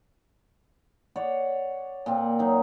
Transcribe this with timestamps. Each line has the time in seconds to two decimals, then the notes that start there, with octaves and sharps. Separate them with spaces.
1.16 C#5 D5 F#5
2.06 A#2 C4
2.39 F#3 D#4